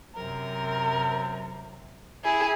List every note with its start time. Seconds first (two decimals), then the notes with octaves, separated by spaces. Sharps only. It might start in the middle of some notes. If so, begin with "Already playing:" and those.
0.15 F#2 C3 A#4
2.24 E4 G#4